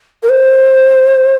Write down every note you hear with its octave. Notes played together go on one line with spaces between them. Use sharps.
A#4
C5